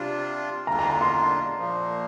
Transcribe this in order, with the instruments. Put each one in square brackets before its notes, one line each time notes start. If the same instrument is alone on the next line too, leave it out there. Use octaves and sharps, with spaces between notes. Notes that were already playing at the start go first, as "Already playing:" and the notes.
Already playing: [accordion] C3 G3 D4 F4
[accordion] E2 D3 G3 D4 F4 [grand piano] A#5
[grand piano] A#5
A#5
C6
[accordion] A#2 F3 A#3